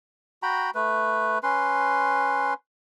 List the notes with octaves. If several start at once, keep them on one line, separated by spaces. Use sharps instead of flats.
F#4 G5 A#5 B5
A3 B4
C#4 B4 C6